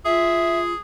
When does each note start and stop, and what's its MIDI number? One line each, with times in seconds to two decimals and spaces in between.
0.05 0.74 65
0.05 0.81 68
0.05 0.59 76